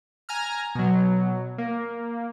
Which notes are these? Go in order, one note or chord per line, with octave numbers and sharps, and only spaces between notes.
G#5 A#5 F6
B2 F#3
A#3